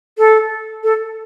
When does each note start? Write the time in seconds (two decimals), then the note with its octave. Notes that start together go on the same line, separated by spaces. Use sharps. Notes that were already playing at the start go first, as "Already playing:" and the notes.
0.18 A4
0.84 A4